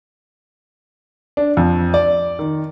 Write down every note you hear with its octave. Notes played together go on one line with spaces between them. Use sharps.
D4
F2
D5
D#3